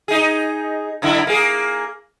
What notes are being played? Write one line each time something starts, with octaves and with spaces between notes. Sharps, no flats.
D#4 G#4
F#2 D3 E4
A#3 G#4